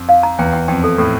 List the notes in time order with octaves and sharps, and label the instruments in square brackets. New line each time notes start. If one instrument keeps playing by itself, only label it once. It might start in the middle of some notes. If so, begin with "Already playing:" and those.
Already playing: [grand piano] F2
[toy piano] F5
A#5
[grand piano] E2 [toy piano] G5
[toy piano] G5
[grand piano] F2 [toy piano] G5
[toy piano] A4
[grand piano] A2 [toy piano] A4